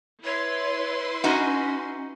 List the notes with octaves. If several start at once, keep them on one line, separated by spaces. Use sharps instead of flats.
E4 B4 C#5 C6
C#4 D#4 F#4